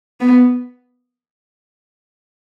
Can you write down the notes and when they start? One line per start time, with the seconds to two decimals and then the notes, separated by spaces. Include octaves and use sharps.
0.20 B3